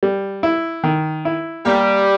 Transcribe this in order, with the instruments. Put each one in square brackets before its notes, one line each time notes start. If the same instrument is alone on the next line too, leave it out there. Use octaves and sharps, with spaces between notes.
[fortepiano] G3
E4
D#3
E4
[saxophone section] G3 [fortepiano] A#3